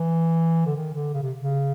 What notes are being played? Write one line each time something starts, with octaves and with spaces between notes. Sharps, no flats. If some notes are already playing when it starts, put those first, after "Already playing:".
Already playing: E3
D3
D#3
D3
C#3
C3
C#3